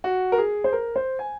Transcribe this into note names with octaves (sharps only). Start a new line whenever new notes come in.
F#4
A#4
G#4
C5
A#4
C5
G#5